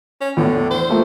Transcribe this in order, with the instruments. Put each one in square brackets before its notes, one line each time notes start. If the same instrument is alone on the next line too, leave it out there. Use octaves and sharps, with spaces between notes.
[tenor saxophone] C#4
[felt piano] E2 A2 [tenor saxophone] D3
[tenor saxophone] C5
[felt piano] F3 A3 A#3